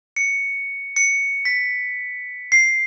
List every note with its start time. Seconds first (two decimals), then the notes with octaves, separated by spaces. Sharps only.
0.16 C#7
0.96 C#7
1.45 B6
2.52 C7